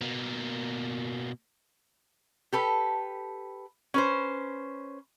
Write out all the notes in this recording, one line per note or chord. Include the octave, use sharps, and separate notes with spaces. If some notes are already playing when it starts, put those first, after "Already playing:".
B2 A#3
G4 A4 B4
C#4 B4 C5